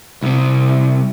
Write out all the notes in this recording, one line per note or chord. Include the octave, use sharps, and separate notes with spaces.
C2 C3